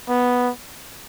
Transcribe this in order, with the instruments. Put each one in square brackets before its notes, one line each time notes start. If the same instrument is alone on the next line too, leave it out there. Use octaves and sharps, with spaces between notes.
[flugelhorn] B3